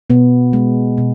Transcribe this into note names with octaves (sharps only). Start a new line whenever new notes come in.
B2 B3
G#3
B2